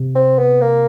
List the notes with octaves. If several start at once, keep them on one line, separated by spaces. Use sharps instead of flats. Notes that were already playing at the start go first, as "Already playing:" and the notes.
Already playing: C3
C4
B3
A#3